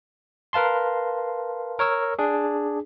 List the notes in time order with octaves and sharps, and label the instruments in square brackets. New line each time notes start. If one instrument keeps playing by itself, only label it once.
[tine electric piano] A#4 B4 F5 A5 C6
A#4 C#5 C#6 E6
D4 G#4